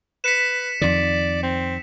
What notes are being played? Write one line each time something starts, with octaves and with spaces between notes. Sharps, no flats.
B4 B6 C#7 E7
F2 D#3 D5
C4